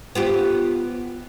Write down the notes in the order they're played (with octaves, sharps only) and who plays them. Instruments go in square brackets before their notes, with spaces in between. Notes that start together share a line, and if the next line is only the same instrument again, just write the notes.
[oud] B3 F4 G4